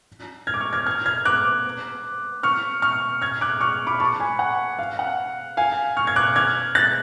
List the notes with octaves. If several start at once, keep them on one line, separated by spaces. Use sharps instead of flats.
F6 G#6
D6
C#6 F6
F6 G#6
F6 G#6
F6 G#6
D6 F#6
C#6 F6
C#6 F6
F6 G#6
D6 F#6
C#6 F6
B5 D6
A5 C#6
G#5 B5
F#5
F5
F#5
F5 G#5
C#6 F6
G#6
D6 F#6
F6 G#6
F#6 A6